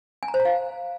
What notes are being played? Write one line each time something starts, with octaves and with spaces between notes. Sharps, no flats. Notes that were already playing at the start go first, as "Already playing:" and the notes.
G#5
A#5
C5
A#5
F5